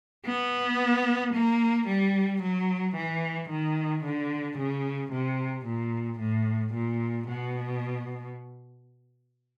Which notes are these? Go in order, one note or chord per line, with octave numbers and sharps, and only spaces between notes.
B3
A#3
G3
F#3
E3
D#3
D3
C#3
C3
A#2
A2
A#2
B2